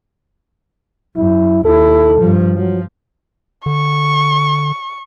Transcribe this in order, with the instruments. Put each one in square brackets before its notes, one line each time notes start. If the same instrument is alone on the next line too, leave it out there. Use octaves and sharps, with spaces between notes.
[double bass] F#2 [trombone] E4
[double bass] D#2 E4 [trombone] A4
[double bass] G2 F3
[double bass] F3 [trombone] F#3
[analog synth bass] D3 [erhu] C#6